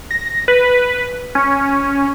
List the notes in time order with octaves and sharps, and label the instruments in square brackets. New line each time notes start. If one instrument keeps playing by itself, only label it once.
[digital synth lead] A#6
B4
C#4